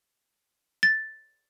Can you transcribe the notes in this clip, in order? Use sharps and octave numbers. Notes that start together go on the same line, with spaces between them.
A6